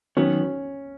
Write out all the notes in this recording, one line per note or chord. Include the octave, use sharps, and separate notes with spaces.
D#3 F#3 B3 C#4